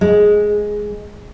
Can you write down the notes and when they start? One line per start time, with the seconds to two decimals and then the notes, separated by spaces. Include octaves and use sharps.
0.01 G#3